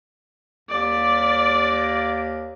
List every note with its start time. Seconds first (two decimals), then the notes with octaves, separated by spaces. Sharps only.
0.69 D#2 D5